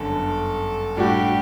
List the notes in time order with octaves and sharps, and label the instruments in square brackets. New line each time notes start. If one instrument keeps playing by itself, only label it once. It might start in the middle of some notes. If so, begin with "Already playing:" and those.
Already playing: [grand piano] G1 F#2 D3 [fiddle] A4
[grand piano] A2 G3 D4 F#4 [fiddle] G4